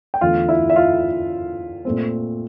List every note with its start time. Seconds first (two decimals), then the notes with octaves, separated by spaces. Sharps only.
0.14 G5
0.21 E2 D3 A3 F4 F5
0.49 E4 E5
0.70 E5
0.76 F4 F5
1.85 A#2 A3 C4